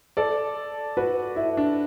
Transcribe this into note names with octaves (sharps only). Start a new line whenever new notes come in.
A4 D5
F#4 B4
E4
D4